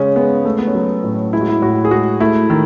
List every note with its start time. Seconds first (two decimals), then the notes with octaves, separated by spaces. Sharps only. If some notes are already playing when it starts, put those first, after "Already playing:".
Already playing: C#3 G#3 C#4
0.16 G#3 B3
0.45 A3
0.59 B3
0.67 C#4
0.75 F#3
1.04 A2
1.33 G#3 E4
1.41 F#4
1.48 E4
1.62 A2 F#4
1.85 G#4
1.91 G#3 F#4
2.20 A3 E4
2.50 D#3